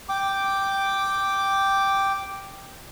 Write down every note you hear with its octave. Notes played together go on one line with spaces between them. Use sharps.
G5 D6